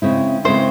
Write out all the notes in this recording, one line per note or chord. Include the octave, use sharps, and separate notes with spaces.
C#3 G#3 C4 E4
C#3 G#3 C4 E4 C5